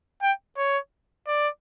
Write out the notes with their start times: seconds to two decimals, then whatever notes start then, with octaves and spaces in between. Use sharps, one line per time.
0.22 G5
0.57 C#5
1.27 D5